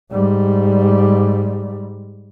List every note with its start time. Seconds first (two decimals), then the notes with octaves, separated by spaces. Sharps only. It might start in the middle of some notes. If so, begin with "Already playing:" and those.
0.12 G#2 G3